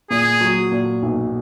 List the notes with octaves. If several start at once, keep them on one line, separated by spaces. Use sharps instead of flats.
A#2 G#4
F#3
A#2
B1